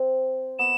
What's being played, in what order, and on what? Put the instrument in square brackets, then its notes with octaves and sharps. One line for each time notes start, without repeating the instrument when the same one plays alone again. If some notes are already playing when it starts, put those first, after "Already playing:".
Already playing: [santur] C4
[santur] B3 [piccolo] E7